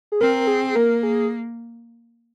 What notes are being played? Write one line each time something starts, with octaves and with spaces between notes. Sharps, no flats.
G#4
C4 A#4
G#4
A#3 A#4
G#4